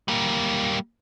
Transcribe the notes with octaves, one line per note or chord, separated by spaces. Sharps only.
G3 A#3